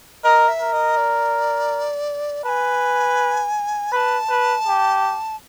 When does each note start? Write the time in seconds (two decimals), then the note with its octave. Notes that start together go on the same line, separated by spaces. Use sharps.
0.24 A#4 D#5
0.48 E5
0.60 A#4
0.73 D#5
0.97 D5
2.45 B4 G#5 A5
3.92 B4 A5 B5
4.29 B4
4.66 G4